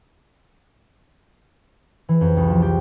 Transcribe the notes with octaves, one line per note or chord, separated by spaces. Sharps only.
E3
F2
C2
F3
G4